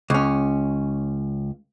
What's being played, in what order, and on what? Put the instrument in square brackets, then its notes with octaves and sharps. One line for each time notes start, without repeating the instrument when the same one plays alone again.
[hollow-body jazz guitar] C#2 C#4